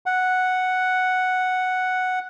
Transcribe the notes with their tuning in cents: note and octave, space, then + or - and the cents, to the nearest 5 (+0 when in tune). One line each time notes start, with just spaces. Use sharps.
F#5 +0